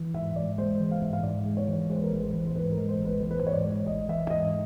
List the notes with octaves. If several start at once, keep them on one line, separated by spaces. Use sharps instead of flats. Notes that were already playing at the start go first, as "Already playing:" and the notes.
Already playing: E3
G#2 E5
G#2 D5
G#3 C5
E3
F5
G#2 E5
F5
G#2 D5
G#3
C#5
E3
G#3 C5
B4
A#4
A1 B4
C5
E3
C5
G#2 B4
A#4
G#3
C5
A1
B4
E3 C5
B4
C5
G#2 C#5
D5
G#3
A1 D#5
E3 E5
G#2 D#5